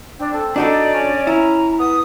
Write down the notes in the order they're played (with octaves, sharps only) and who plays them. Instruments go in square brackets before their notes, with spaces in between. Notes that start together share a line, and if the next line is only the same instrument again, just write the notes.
[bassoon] C4 [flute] D4
[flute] A4
[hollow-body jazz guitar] D4 F#4 A4 [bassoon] D#4 [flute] D5
[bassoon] C#4
[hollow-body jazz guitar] E4 [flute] A#5
[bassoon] B3 [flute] D#6